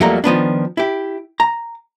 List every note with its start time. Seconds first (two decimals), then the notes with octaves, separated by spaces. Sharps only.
0.01 F2 F#3 G3 A3 A#3 A#5
0.24 D#3 F3 B3 D4
0.77 E4 G4
1.40 A#5